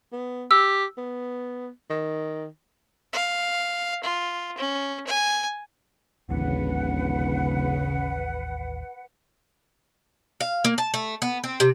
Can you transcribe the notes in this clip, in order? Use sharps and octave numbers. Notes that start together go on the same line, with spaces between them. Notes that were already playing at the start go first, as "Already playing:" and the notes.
B3
G4 E6
B3
D#3
F5
F4
C#4
G#5
D1 A1 D#2 C#3 E3 B4 F#5
F5
A#3
A5
A3
B3
C4
C3